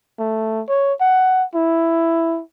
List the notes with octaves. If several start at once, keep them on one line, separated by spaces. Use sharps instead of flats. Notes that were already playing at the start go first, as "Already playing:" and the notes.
A3
C#5
F#5
E4